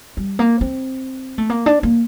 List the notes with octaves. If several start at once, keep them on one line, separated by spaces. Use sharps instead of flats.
G3
A#3
C4
A3
A#3
D4
A#3